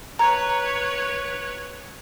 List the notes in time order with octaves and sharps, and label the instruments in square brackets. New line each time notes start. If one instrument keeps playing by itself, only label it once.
[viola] B4 C#5 [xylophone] A#5